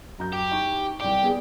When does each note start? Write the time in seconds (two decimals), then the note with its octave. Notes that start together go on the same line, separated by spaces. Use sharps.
0.18 F#2 A#5 G6
0.33 G4
0.52 D#4 C#6
1.01 C2 G4 D5
1.23 B3 G#4 D5